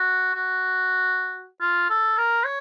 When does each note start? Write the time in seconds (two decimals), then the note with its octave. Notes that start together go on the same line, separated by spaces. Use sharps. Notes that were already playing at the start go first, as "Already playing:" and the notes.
Already playing: F#4
0.34 F#4
1.61 F4
1.89 A4
2.18 A#4
2.44 C#5